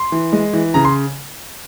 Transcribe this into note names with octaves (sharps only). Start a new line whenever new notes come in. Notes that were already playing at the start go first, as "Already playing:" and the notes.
Already playing: C6
E3
G#3
E3
C#3 A#5
C6